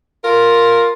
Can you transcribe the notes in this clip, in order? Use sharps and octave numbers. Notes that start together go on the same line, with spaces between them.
F4 A#4